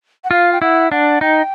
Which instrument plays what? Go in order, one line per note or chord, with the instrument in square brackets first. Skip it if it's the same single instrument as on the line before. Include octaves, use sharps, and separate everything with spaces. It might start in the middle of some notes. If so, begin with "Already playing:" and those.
[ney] F#5
[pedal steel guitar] F4 [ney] F5
[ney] G5
[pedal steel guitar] E4 [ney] F#5
[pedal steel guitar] D4 [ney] F#5
[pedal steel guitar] D#4 [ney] G5